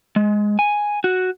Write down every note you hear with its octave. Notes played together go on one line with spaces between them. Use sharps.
G#3
G#5
F#4